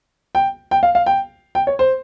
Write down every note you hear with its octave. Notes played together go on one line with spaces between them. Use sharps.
G5
G5
F5
F5
G5
G5
C#5
C5